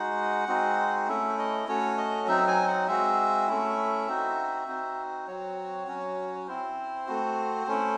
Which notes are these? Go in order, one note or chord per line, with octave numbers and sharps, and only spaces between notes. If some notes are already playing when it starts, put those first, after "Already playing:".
Already playing: G#3 D#4 F#4 F#5
G#3 C4 D#4 F#4
A3 C#4 E4 E5
D#5
A3 C#4 F#4 C#5
D#5
F#3 C4 D#4 E5
G#5
F#5
G#3 C4 F#4 E5
A3 C#4 E4
C4 D#4 F#4
C4 D#4 F#4
F#3 C4 F#4 C#5
F#3 C#4 F#4
C4 E4 C5
A3 C4 F#4
A3 C#4 E4